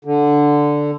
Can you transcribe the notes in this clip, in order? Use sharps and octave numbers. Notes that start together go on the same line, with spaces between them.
D3